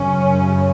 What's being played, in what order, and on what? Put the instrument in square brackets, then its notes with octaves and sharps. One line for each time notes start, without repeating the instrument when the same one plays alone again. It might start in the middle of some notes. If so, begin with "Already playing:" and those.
Already playing: [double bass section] F#2 C#3 C#4